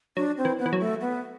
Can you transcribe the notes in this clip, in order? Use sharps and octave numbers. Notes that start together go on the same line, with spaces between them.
F#3 D4
C4
E3
B3
E3
F#3
A3
B3